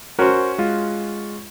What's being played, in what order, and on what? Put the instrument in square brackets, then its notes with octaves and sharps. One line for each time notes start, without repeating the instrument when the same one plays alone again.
[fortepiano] C#4 F#4 [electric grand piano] A#4 C5
[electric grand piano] G#3 F4